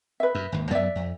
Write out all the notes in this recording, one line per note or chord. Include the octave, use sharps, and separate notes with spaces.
B4 E5
F#2
G#1 D#2
F#2 F#3 B3 D5 E5
F2